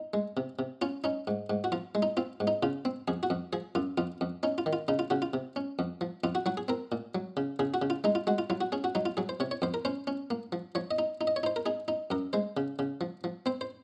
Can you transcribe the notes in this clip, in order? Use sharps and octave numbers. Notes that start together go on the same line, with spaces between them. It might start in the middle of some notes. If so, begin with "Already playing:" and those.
Already playing: D#4
G#3
C3
C3
C#4 F4
C#4 D#4
G#2
G#2
F#4
F3 F4
G#3
D#4
C4 F4
G#2
D#4
C#3 F4
C4
F2 G#4
F#4
F2
F3 G#4
F#2 F4
F2 F4
F2
C#4 D#4
F4
D#3
F4
C#3 D#4
F4
C#3 F#4
F4
C3
C#4
F2
F3
F2 F4
F#4
F#3 F#4
G#4
C4 A#4
A#2
F#3
C#3
C#3 G#4
F#4
C#3
F4
G#3 D#4
F4
G#3 F#4
F4
F#3 F4
F#4
C#4 G#4
F#4
F#3 D#4
F4
F#3 G#4
C5
C3 C#5
C#5
F2 C5
A#4
C#4 C5
C#4
A#3
F3
F3 C#5
D#5
D#4
D#4
D#5
C#5
D#4 C5
A#4
D#4 G#4
D#4
F#2 A#4
G#3 C5
C#3
C#3
F3
F3
C4 C5
C5